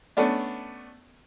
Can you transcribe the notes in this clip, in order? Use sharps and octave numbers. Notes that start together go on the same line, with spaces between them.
A3 B3 C#4 D4